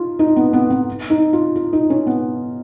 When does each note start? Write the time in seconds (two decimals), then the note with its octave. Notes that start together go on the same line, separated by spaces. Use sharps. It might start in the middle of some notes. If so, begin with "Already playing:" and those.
Already playing: D#4 F4
0.19 D#4
0.36 B3
0.53 B3
0.70 B3
1.10 D#4
1.33 F4
1.56 F4
1.73 D#4
1.90 C#4
2.07 B3